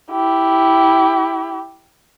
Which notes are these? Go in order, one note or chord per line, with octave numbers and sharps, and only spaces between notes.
E4 G4